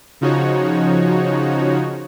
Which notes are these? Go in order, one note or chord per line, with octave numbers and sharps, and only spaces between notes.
C#3 F3 D#4 F#4 C#5